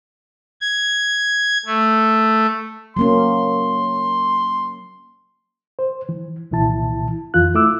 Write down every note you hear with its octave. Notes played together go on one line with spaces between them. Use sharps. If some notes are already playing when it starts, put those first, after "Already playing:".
G#6
A3
F#3 A#3 C#4 C6
C5
E3
C2 A#2 E3 E4 A5
F2 E3 F4 F#6
A3 E4 D6 E6